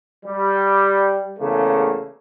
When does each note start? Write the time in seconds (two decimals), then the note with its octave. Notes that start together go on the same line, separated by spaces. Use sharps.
0.25 G3
1.39 E2 C#3 A3 A#3